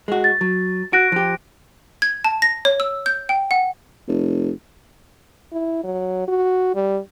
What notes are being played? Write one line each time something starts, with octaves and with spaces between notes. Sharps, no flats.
G#3 F#4
A6
F#3
F#4 F#6 A#6 D7
F3 G4
G#6
A5
A#6
C#5
E6
G6
G5
F#5
F1
E4
F#3
F#4
G3